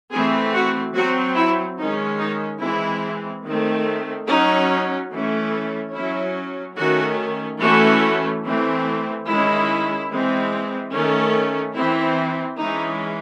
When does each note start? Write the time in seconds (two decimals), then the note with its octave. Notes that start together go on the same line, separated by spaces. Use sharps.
0.11 E3 A3 C4 G#4
0.53 F#4
0.94 F#3 C4 F#4
1.36 E4
1.78 D#3 G#3 C#4 D#4
2.19 D#4
2.60 E3 G#3 C4 E4
3.44 D#3 A3 C4
4.27 F#3 C#4 D#4
5.11 E3 A3 C#4
5.93 F#3 C#4 E4
6.76 D#3 A3 C#4 F#4
7.60 E3 A3 C#4 F#4
8.43 E3 A3 C4
9.26 D#3 G#3 C#4 E4
10.10 E3 G#3 C4
10.92 D#3 A3 C#4
11.75 E3 C4 E4
12.58 E3 G#3 C#4 D#4